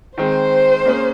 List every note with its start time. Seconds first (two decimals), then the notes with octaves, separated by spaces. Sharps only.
0.18 D#3 G#3 C4 C5
0.86 A#3 C#4 G#4